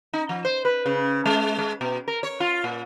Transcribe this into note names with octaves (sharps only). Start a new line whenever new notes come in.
D#4
F3
C5
B4
C#3
G#3
G#3
B2
A#4
C#5
F4
A#2